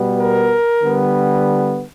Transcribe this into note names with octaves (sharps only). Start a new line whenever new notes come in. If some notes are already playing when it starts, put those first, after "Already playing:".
Already playing: B2 G3 B3
A#4
D3 G3 B3